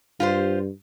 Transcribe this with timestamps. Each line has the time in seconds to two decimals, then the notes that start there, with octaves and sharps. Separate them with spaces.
0.20 G2 F4 G4 C5